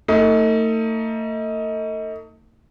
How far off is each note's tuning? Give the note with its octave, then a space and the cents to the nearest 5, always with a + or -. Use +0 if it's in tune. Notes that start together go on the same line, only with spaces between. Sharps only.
A3 +40 D#4 +30